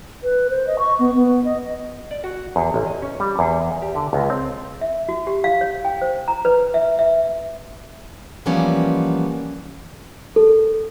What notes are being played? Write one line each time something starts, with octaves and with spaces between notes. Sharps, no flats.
B4
C5
D#5
C#6
B3
B3
D#5
D5
F#4
E2
A1
D#5
C#4
G3
E2
G4
D3
C#2
C4
E5
F#4
G4
F5
C#5
G5
C5
A#5
B4
E5
E5
E3 F3 G3 A#3 B3 C#4
A4